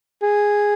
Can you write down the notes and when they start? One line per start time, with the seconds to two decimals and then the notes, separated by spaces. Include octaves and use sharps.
0.22 G#4